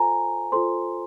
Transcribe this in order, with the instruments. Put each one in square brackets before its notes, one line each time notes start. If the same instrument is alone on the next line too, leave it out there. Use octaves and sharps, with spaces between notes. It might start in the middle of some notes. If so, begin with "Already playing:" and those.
Already playing: [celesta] F4 A4 C5 G#5 A#5
F4 A4 C5 C6